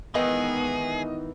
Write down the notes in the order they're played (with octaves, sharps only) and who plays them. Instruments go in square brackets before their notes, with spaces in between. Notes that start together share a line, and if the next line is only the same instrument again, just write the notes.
[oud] D#3 E3 [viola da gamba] G#3 B3 [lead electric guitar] G#4 [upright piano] D#5